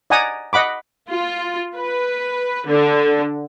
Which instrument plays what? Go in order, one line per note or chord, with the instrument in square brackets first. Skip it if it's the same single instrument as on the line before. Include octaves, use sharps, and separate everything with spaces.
[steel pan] D5 D#5 F#5 G#5 A#5 D#6
D#5 F#5 B5 D6
[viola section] F4
B4
D3